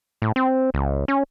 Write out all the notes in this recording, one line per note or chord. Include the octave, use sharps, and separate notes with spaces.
A2
C4
C#2
C#4